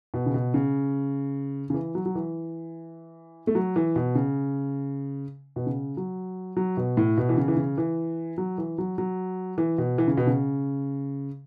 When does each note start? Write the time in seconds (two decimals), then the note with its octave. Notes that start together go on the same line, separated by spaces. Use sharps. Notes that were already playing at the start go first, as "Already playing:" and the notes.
0.14 B2
0.26 C#3
0.34 B2
0.54 C#3
1.70 C#3
1.74 E3
1.95 F#3
2.06 F#3
2.15 E3
3.47 A3
3.55 F#3
3.76 E3
3.96 B2
4.15 C#3
5.56 B2
5.66 C#3
5.97 F#3
6.57 F#3
6.77 B2
6.97 A2
7.17 B2
7.29 E3
7.37 C#3
7.48 E3
7.57 C#3
7.78 E3
8.38 F#3
8.58 E3
8.78 F#3
8.98 F#3
9.58 E3
9.78 B2
9.98 E3
10.08 C#3
10.17 B2
10.27 C#3